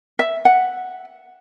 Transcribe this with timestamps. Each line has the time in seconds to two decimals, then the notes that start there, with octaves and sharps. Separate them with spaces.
0.19 E5
0.45 F#5